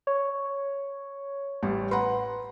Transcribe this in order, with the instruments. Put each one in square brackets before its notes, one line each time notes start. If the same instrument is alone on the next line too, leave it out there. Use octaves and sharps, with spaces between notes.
[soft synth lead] C#5
[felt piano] A1 G3
[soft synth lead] B4 [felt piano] F#5 A#5 C6